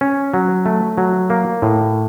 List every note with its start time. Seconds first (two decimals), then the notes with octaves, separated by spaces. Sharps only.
0.01 C#4
0.34 F#3
0.66 A3
0.98 F#3
1.30 A#3
1.62 A2